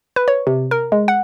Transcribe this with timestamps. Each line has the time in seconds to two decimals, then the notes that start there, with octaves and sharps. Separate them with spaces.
0.16 B4
0.28 C#5
0.47 C3
0.71 A#4
0.92 G#3
1.08 F#5